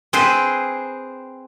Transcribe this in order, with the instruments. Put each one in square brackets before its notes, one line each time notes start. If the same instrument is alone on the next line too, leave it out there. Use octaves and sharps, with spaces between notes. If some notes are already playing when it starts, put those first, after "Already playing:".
[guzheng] C4 G#4 B4 C5